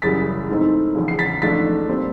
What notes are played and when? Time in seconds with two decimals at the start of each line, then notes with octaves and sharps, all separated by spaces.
0.02 F#1 F#2 C#3 E3 G3 A6 B6
0.49 G#2 E3 A3 C4 D#4
0.95 E1 E2 C#3 F3
1.08 C7
1.19 A6 B6
1.42 A1 G#2 F3 A3 D4 A6 B6
1.89 A#2 G3 C4